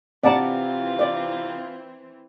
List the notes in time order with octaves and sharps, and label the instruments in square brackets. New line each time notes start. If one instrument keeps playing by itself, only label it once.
[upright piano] C3 A#5 [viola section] E3 C4 [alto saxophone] F4 [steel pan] D5 F#5 A5
[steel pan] D5